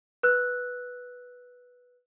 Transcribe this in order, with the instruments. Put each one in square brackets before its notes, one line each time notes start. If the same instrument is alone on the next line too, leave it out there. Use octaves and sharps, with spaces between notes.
[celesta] B4 E6 F#6